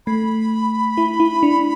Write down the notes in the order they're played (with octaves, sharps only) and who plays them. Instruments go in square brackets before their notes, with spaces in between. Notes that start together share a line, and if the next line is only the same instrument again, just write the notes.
[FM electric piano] A3 [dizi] B5
[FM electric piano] E4
E4
D4